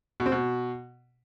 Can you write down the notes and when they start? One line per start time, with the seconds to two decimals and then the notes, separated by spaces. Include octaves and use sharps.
0.20 B2
0.26 C4
0.32 B2